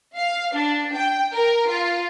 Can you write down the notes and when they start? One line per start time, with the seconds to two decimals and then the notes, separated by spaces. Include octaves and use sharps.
0.15 F5
0.53 D4
0.93 G5
1.32 A#4
1.67 F4